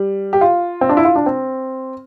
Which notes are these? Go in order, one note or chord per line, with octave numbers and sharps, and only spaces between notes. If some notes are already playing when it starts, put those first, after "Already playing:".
Already playing: G3
G4
F4
C4
D4
E4
F4
D4
C4